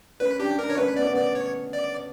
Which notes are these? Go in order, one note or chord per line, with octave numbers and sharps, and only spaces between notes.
C#4 B4
D4 G4
D4 A#4
C#5
C#4 B4
B3 D5
C#4
B3 D5
C#5
D5